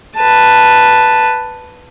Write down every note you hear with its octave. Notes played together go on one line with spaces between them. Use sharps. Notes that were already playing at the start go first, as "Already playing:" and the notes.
B4 A5